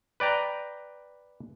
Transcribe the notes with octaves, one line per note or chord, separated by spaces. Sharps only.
B4 D5 G5 A#5